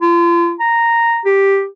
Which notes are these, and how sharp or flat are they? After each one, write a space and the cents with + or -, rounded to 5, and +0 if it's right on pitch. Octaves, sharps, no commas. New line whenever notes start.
F4 -35
A#5 -5
G4 +0